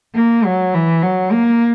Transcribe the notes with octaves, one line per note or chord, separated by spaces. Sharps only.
A#3
F#3
E3
F#3
A#3